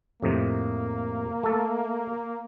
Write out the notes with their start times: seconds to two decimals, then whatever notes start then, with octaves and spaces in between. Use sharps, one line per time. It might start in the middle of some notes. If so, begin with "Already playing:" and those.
0.22 F2 A2 C3 A#3
1.43 A3 A4